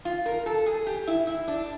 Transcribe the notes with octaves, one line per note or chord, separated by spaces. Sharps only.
F4
A#4
A4
G#4
G4
E4
E4
D4